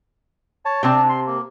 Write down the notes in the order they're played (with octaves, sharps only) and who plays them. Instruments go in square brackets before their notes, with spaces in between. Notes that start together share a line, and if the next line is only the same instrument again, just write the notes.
[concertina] C#5 A5
[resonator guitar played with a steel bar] C3 C4 A5 [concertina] D4
[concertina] C6
A#3